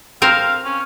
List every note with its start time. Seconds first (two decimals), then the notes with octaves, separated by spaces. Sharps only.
0.22 C4 A#4 C5 F5
0.65 C#4